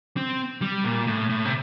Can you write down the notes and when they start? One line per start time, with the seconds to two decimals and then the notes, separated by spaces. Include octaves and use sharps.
0.17 C4
0.62 G3
0.84 A#2
1.07 A2
1.29 A2
1.45 C3